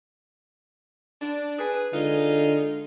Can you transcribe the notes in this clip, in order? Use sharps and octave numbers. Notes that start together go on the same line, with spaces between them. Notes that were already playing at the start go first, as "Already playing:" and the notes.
D4
G#4 B4
D3 G#3 D#4 F4